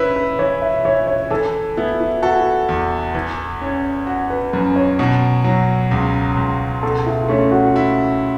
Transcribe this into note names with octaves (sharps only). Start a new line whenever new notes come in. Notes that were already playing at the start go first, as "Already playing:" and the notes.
Already playing: C#4 E4 B4 C#5
B4
E3 C#5
E5
E3 C#5
C#5
E3 A4
B3 E4
E4
F#4 A4
E2
E3
C#4
F#4
B4
F#2 B4
C#5
B2
F#3
C#2
C#2
B2 A4
E4
A3 C#4
F#4
E4